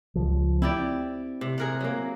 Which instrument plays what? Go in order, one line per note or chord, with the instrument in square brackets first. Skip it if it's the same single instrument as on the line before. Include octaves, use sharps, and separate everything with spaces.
[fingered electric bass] C#2 F3
[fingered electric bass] C4 [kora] E4 G4 D5
[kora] C3
G#4 A#4 F#5
F#3 A#3